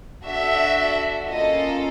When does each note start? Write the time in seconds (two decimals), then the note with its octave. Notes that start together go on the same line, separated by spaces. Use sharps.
0.24 D4 F#4 A4 E5
1.28 A#3 C#4 F4 A4 D#5